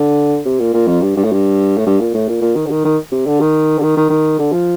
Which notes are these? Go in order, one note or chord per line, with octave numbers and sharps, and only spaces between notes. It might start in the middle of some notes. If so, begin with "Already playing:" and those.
Already playing: D3
C3
A#2
A#2
F2
G2
G2
A2
G2
A2
G2
A#2
A2
A#2
A#2
D#3
D3
D#3
D#3
C3
D3
D#3
D3
D#3
D#3
D#3
D3
F3